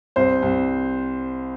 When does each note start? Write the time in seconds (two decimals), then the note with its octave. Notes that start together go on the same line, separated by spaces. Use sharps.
0.16 C2 C5
0.42 C2